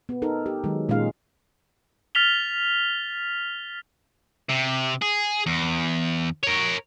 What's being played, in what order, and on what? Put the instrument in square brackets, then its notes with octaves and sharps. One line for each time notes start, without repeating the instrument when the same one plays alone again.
[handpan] B3
D#4 A4 A#4
G4
D#3 F#3 G#3
A#2 G#3 C#4 D#4 F4 F5
[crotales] F6 A6 B6 F7 G7
[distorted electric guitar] C3
G#4
E2
A#4 C#5